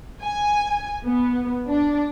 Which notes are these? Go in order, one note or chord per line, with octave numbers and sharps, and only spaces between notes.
G#5
B3
D4